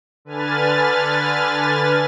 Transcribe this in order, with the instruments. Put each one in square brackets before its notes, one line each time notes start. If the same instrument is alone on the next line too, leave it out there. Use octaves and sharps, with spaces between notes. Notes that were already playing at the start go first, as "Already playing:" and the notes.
[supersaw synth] D3 B4 G#5 F6 A6